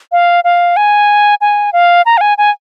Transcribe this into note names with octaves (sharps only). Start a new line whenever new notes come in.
F5
F5
G#5
G#5
F5
A#5
F5
G#5
G#5